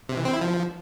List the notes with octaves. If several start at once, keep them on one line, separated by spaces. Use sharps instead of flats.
C3
E3
C4
E4
F3